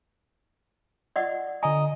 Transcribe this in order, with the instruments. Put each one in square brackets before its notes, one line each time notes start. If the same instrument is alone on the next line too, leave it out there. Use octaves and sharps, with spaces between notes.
[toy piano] D5 D#5 F#5
[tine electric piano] D3 A#5 [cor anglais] D#5 [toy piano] G#5